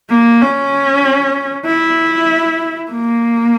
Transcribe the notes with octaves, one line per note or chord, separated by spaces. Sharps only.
A#3
C#4
E4
A#3